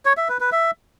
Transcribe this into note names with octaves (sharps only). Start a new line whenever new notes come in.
C#5
E5
B4
B4
E5